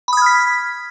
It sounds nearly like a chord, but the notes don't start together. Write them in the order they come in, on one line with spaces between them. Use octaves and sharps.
B5 D#6 G#6 F6 B6